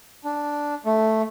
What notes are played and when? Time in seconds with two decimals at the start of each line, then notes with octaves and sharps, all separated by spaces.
0.24 D4
0.86 A3